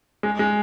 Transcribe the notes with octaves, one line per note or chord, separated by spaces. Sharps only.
G#3
G#3